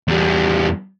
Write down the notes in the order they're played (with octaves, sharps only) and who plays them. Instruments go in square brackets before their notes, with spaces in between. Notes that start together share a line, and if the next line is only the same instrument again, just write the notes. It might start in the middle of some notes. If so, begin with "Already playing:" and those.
[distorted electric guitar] E2 G3